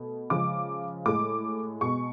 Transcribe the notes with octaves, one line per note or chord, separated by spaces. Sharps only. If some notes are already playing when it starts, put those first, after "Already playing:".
Already playing: B2 A3
C#3 F3 G#3 D6
A2 G#3 D6
B2 G#3 C#6